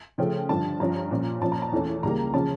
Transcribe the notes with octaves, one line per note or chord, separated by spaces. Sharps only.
C#3 F3 A3 C#4 G5
G2 D3 F3 A5
G2 F3 C#4 A#5
A#2 F3 C#4
A#2 F3 C#4 A5
A#5
A5
E2 E3 A3 C#4
C#2 C#3 G3 A#3 A#5
C#3 F3 C#4 A5